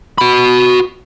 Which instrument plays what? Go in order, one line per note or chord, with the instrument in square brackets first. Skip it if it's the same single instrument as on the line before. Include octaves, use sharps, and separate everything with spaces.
[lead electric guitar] F#4 B5